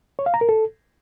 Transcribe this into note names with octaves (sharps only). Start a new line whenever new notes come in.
C#5
F5
A#5
A#4
A4